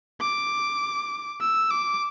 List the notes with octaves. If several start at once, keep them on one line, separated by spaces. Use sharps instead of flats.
D6
E6
D6